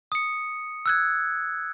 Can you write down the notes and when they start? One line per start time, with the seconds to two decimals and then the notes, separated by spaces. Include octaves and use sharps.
0.12 D#6 C#7
0.86 E6 F#6 G#6